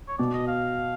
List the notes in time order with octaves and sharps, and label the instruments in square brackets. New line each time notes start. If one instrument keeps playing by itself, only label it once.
[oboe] C#5
[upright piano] B2 [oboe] D5
[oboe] D#5
F5